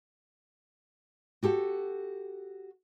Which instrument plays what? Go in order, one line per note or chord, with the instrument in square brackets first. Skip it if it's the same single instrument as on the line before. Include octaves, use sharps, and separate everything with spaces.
[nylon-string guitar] F#4 G4 A4 F#5